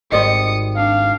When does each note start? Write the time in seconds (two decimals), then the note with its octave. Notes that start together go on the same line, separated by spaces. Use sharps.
0.12 G#1 G#2 D#3 G3 C4 D#6 C#7
0.76 D4 F5